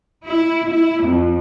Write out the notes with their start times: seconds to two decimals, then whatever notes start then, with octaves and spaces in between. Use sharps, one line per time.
0.24 E4
0.69 E4
1.04 F2